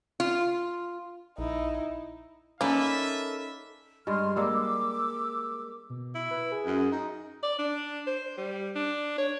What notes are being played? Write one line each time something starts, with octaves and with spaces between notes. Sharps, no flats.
F4
A#1 D#4 E4
A#3 C#4 D#4 A4 B4 D5 E5
G2 G#3 C6 F6
G3 G#3 A#3 D6 E6
B2
E4
B4
G#4
F#2
D#4
D5
D4
C5
G3
D4
C#5